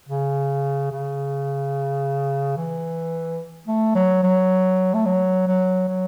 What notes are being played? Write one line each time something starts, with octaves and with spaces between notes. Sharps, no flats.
C#3
C#3
E3
A3
F#3
F#3
A3
F#3
F#3
F#3